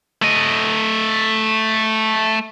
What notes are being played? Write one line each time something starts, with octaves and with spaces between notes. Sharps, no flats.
A3 D#5